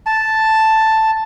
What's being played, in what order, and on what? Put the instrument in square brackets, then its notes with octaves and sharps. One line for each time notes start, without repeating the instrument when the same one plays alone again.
[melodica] A5